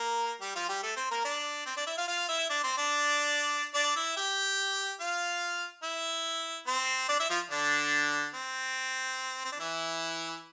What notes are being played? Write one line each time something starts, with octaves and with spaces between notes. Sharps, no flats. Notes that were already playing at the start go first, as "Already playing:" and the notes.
Already playing: A#3 A#4
G3 G4
F3 F4
G3 G4
A3 A4
C4 C5
A#3 A#4
D4 D5
C4 C5
D4 D5
E4 E5
F4 F5
F4 F5
E4 E5
D4 D5
C4 C5
D4 D5
D4 D5
E4 E5
G4 G5
F4 F5
E4 E5
C4 C5
D4 D5
E4 E5
F3 F4
D3 D4
C4
C4
D4
E3 E4